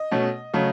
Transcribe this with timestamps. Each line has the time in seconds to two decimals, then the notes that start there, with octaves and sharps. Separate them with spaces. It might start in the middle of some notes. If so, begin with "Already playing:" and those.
Already playing: D#5
0.11 B2 A3 C#4
0.54 C#3 F#3 A3 C#4